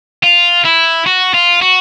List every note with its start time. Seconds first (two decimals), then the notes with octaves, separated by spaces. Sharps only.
0.23 F4
0.65 E4
1.06 F#4
1.34 F4
1.62 F#4